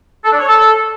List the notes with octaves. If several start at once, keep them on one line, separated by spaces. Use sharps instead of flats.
A4
D4
C#5
A4